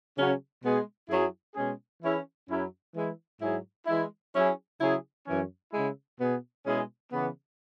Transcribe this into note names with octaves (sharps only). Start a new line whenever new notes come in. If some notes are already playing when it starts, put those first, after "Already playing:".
C#3 F#3 C#4 F#4
B2 G#3 B3 G#4
F#2 F#3 E4 G#4
B2 G#3 C#4 G#4
E3 C#4 E4 G#4
F#2 F#3 C#4 E4 G#4
E3 G#3 E4
G#2 F#3 E4 G#4
E3 G#3 E4
F#3 C#4 E4 G#4
C#3 F#3 E4 G#4
F#2 E3 C#4
C#3 G#3 E4
B2 B3 G#4
B2 G#3 C#4 E4 G#4
C#3 E3 B3